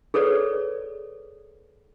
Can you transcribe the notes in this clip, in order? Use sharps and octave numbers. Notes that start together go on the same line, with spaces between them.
G#4 A4 B4 C#5 D5